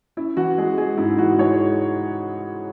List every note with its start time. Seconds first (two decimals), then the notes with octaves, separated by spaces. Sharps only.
0.17 C#4 E4
0.37 E3 F#4
0.58 G#3 G#4
0.77 G#3 G#4
0.98 G#2 E4
1.18 E3 F#4
1.38 G#3 C#5